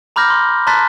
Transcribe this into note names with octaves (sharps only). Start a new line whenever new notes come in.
A#5 B5 D6 F6 G6 A#6
C6
A5 A#5 C6 F#6 A6 B6